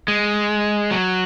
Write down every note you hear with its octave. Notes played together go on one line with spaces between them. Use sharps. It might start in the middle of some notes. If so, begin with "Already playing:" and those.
G#3
F#3